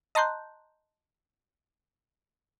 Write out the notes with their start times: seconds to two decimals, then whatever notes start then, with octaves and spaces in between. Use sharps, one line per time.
0.15 D#5 A5 A#5 C6 F#6 G6